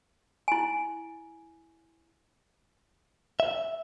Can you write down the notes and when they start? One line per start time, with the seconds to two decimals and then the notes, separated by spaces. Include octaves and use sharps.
0.48 E4 G#5
3.40 E5